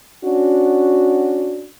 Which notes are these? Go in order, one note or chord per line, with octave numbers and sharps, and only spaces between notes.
C#4 D4 F#4